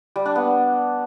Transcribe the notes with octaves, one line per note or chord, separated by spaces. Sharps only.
G3
D4
B3